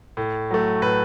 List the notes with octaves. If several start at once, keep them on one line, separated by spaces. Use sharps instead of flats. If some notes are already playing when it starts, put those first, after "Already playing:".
A2
F#3 A3
A2 B4